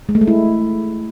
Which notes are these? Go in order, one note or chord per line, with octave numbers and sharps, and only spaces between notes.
G#3
A3
G#3
E4